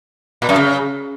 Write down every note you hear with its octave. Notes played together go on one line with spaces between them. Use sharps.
A#2
F#2
C#3